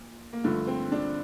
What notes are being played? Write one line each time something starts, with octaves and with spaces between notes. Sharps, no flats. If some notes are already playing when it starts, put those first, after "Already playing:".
Already playing: A#2
A#3
G2 D3 F3 A3
C4
D4